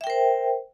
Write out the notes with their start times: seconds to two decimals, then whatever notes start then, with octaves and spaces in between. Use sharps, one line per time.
0.01 E5
0.04 G5
0.07 A#4
0.10 C5